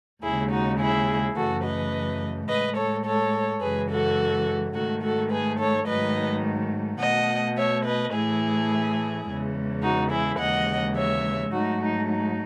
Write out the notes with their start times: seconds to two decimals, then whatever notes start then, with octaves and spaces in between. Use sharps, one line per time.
0.23 D#2 C#3 G#3 E4 G#4
0.51 D#4 F#4
0.79 E4 G#4
1.36 F#2 C#3 E3 A3 F#4 A4
1.63 B4 D#5
2.48 A2 G#3 B4 D#5
2.76 A4 C#5
3.05 A4 C#5
3.61 F#2 C#3 E3 G#3 G#4 B4
3.89 F#4 A4
4.74 G#2 D#3 A3 F#4 A4
5.02 F#4 A4
5.31 G#4 B4
5.59 A4 C#5
5.87 G#2 D#3 F#3 A3 B4 D#5
7.00 B2 A3 D#5 F#5
7.57 C#5 E5
7.85 B4 D#5
8.13 A2 E3 A3 E4 G#4
9.26 E2 C#3 E3 G#3
9.83 D#4 F#4
10.11 E4 G#4
10.38 D#2 C#3 E3 G#3 D#5 F#5
10.96 C#5 E5
11.52 G#2 F#3 A3 D#4 F#4
11.80 D#4
12.08 D#4